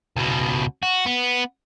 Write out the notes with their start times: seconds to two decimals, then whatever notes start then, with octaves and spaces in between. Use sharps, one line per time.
0.16 C#2 B2
0.83 F#4
1.06 B3